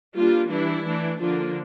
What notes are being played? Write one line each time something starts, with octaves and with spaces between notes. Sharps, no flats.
G3 A#3 D4 F4
E3 G3 D4 E4
E3 A3 D4
D3 F3 A#3 D4 F4